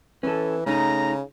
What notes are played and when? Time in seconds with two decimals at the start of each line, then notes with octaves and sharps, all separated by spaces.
0.23 E3 C#4 A4
0.66 C#3 A3 D#4 A#5